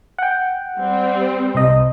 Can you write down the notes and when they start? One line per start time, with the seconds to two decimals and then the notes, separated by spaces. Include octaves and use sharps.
0.18 F#5 G5
0.77 G3 C4
1.55 C2 D#5